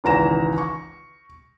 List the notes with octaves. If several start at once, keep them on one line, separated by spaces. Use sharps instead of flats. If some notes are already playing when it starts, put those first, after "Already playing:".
G#1 C#2 E3 A#5 A#6 E7
C#6